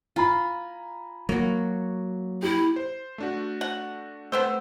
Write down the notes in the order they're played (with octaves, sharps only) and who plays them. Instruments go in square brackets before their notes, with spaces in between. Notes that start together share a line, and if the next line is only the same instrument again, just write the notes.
[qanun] F4 [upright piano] G#5 A#5 B5
[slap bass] F#3 [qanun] A#3 F#4
[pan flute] E4 [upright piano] G4
[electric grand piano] C5
A3 D4 F#4
[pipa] F#5
[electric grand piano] A3 E6 [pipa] B3 C4 C5